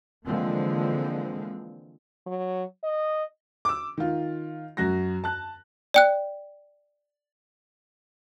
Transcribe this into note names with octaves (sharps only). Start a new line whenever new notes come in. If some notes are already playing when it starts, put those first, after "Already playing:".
D3 E3 F3 G#3 A#3 C4
F#3
D#5
D6 E6
D#3 F4
F#2 F#4 A#6
A5 F#6
D5 G5 F#6